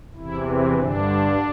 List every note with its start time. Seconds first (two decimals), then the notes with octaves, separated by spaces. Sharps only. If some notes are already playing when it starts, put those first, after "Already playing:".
0.16 E2 C3 E3 E4
0.45 C4
0.74 G2 D3 D4